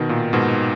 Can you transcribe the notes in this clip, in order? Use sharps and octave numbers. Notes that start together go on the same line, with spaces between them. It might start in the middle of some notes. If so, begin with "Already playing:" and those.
Already playing: B2 D#3
A#2
G#2 B2